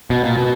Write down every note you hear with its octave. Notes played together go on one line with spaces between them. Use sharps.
B2
A#2
B2